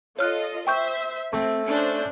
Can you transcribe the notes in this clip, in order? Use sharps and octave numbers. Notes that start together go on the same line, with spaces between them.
F4 A4 C#5 D#5 F6 F#6
C5 E5 G5 C#6 G6
A3 C4
C#4 D4 C5